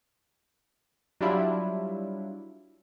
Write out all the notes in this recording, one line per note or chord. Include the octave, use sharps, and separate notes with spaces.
F#3 G3 D4 E4 F4